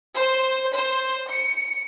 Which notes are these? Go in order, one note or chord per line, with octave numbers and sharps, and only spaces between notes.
C5
C5
C#7